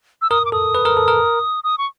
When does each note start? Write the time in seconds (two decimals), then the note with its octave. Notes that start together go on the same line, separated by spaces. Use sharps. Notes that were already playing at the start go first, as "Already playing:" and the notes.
0.22 E6
0.30 A#4 D#6
0.45 D6
0.52 A4 D#6
0.75 B4
0.85 A#4
0.97 A4
1.08 A#4
1.64 D#6
1.78 C#6